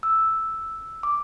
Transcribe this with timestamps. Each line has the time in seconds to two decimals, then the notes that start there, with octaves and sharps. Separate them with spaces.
0.03 E6
1.03 D6